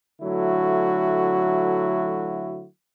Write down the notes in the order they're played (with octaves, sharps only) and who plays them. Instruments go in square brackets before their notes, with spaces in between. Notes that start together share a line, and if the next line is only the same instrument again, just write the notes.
[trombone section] D3 F#3 A3 E4 F#4